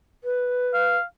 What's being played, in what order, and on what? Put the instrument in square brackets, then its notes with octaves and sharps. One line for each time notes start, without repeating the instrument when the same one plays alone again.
[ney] B4
[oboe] F5